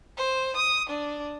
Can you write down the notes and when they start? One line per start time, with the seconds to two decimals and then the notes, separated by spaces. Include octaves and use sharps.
0.17 C5
0.56 D#6
0.89 D4